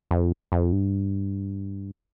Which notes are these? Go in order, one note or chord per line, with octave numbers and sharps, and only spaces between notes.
F2
F2
G2